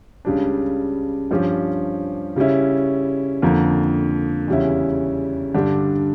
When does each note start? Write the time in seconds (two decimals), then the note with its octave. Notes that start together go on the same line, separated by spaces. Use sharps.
0.25 C#2 C#3 G3 D4
1.31 G2 F3 C#4 G4
2.36 C#3 G3 C#4 E4
3.42 F2 D3 F3 A#3
4.48 E2 C#3 G3 C#4 E4
5.54 G2 D3 G3 D4 G4